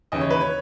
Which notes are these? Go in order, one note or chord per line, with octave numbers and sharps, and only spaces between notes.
D#2 C#3 E3 D#5
C#5
B4
C#5